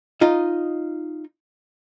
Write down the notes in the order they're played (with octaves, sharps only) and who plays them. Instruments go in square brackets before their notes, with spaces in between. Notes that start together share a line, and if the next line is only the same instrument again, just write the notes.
[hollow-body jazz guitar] D#4 F4 D#5